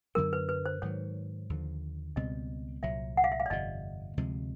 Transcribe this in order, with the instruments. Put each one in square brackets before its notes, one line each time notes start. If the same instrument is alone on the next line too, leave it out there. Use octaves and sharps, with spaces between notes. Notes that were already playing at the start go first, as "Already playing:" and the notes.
[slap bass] F#2 D3 F#3 B3 [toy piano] A#4
[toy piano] B4
B4
C5
[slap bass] G#2 D#3 F#3 [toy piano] C#5
[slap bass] D#2 D3 F3
[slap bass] C#2 B2 G3 C4 [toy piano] D#5
[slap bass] C2 A#2 F#3 [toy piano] E5
[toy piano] F#5
F5
E5
F5
D5
[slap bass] G1 F2 C3 [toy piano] D#5
[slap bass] D2 C3 F3 G#3